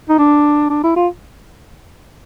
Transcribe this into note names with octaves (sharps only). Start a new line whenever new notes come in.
D#4
D4
D4
E4
F4